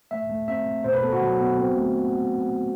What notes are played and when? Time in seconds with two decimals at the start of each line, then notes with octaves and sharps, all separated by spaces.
0.11 A3 E5
0.30 A3
0.48 C4 E5
0.66 A3
0.84 B2 C5
0.93 B4
1.02 B3 A4
1.12 F#4
1.21 F#3
1.40 B3
1.58 C4
1.76 A3